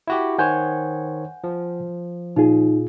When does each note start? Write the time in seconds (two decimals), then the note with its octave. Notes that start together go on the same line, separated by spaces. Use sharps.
0.07 E4 F#4 G4
0.38 D#3 C5 C#5 F#5 G#5 G6
1.44 F3
2.36 A#2 D#4 F4 G#4